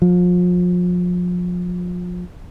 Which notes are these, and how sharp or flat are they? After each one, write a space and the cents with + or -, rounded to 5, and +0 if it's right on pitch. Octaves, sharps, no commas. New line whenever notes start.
F3 +35